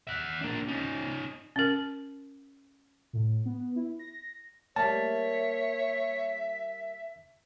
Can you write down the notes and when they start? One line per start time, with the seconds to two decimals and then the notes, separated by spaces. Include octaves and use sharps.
0.07 E5 F#5
0.41 A#3 D4
0.68 C#4 D#4
1.56 C#4 A#4
3.13 A2
3.46 B3
3.76 E4
3.99 A#6
4.76 G3 A#3 C#5 E5 A5